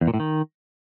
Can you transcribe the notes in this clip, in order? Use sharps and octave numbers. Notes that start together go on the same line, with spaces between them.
E2
A#2
A2
D#3